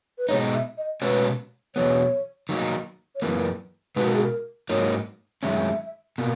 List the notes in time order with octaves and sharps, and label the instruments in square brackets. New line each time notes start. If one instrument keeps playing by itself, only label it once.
[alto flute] B4
[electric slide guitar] B2 G#3 D#4 [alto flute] C#5
[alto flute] E5
D#5
[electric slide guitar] B2 G#3 C#4 F#4 C#5 [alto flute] B4
[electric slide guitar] E2 B2 F#3 B3 [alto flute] C#5
[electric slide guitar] D#3 F#3 A#3 D#4
[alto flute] C#5
[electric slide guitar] F#2 E3 A#3 [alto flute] B4
[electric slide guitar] B2 G#3 D#4 F#4 [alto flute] B4
[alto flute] A#4
G#4
A#4
[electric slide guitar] G#2 F#3 A#3 D#4 [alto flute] C#5
[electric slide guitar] F#2 D#3 G#3 C#4 [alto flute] E5
[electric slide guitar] B2 A#3